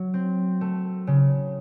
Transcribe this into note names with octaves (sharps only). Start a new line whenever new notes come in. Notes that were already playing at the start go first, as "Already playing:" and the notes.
Already playing: F#3
C4
A3
C#3